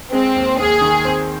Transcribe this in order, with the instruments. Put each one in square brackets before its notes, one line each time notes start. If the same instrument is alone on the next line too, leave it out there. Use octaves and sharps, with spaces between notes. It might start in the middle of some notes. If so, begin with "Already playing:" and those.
[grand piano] G#3 [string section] C4
[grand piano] D#2
[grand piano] D#2 [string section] G#4
[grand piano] D#3
C4